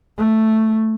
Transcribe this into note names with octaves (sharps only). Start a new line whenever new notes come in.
A3